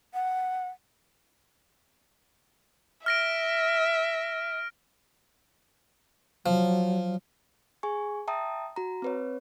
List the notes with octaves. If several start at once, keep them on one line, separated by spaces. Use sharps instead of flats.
F#5
E5 F6 A#6 D7
F3 F#3
G#4 G#5 C#6
E5 G5 A5 A#5 D#6
F#4 A#5
C4 B4 C#5